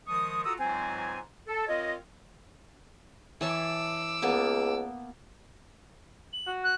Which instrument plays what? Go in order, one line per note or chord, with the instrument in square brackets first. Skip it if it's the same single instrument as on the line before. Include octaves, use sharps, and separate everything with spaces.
[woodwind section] D#3 F3 G#3 C#6 D#6
F4 F#4 A4 A#5 D#6 E6
C#2 G#2 E3 F#3 C4 G#5
A4
C4 F4 A#4 C#5 D#5
[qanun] E3 C#5 A5 [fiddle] D6 E6
[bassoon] C#2 [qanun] A#3 B3 A5
[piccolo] F#7
[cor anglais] F#4
[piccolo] F#6